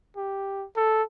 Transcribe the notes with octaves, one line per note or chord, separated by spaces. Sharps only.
G4
A4